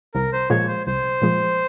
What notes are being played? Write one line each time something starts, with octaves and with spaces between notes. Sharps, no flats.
C2 A#4
C5
A#2 F3 G#3 C#5
C5
C2 C5
A#2 F3 G#3